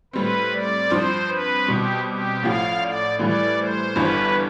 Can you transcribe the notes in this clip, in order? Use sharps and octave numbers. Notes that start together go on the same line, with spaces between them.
A2 G3 C4 B4
D5
G2 F3 C4 C5
B4
B2 G3 C4 G4
G4
A1 A2 F3 F5
D5
A2 E3 G3 D5
C5
G1 G2 E3 G3 B4